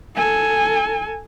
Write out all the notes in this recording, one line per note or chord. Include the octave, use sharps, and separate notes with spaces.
A4 G#5